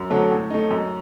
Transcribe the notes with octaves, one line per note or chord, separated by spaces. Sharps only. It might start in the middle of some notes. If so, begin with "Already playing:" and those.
Already playing: F#2
D3 F#3 A3
A2
A3 D#4
F#2